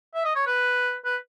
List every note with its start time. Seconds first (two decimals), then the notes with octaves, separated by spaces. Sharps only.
0.14 E5
0.25 D#5
0.35 C#5
0.46 B4
1.05 B4